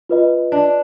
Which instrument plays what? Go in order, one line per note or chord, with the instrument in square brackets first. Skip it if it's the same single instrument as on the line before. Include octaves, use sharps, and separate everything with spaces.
[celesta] F4 B4 D#5
[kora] D4